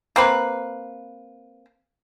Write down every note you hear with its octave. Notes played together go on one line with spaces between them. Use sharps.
A#3 C4 B4